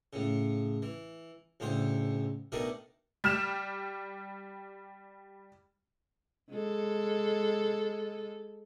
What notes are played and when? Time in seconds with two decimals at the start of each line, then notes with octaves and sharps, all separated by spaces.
0.13 A2 C#3
0.82 E3
1.60 D2 A2 C#3 C5
2.52 B2 D#3 A3 D4 A#4 D#6
3.24 G3 F6 E7
6.51 G#3 A4